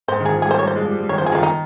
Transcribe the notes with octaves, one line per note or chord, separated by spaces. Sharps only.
G#2 C5
D#3
F3 G#4
G3 G#4
C5
G3 C#5
C5
G#3
F3
G3
G3
D#3 C#5
C5
F3
G#4
D#3 F4
D#4